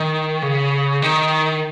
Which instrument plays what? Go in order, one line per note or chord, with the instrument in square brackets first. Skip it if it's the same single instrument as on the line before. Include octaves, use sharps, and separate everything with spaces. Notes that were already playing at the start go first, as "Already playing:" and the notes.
Already playing: [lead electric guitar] D#3
C#3
D#3